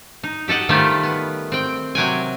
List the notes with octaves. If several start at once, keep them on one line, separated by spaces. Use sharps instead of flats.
D#4
G4 A4 D#5 F#5
D#3 G3 A3 F4 G4 C5
B3
C4 G5
C3 F#3 G5 G#5